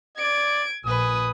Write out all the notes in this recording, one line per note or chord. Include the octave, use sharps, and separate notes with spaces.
D5 G#6 D7
A#1 B4 G#5 D#6